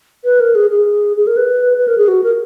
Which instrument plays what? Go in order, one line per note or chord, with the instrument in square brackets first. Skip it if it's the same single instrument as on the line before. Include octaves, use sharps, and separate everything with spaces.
[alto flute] B4
A#4
G#4
G#4
G#4
A#4
B4
B4
A#4
G#4
F#4
A#4